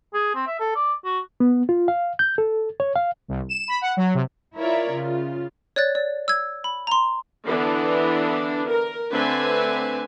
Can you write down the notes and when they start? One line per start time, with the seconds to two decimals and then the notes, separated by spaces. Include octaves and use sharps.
0.14 G#4
0.35 C4
0.47 E5
0.60 A4
0.76 D5
1.05 F#4
1.40 B3
1.69 F4
1.88 F5
2.19 G6
2.38 A4
2.80 C#5
2.96 F5
3.28 C2
3.49 E7
3.68 B5
3.81 F#5
3.97 F#3
4.14 C3
4.56 E4 F4 A#4 C#5 D5 E5
4.91 C#3 F4
5.76 C#5 D5 F#6 A6
5.95 D5
6.28 E6 G#6
6.64 B5
6.87 A#5 C6
7.46 D3 E3 B3 D4
8.67 A#4
9.11 D3 A3 C4 B4 E5 G#5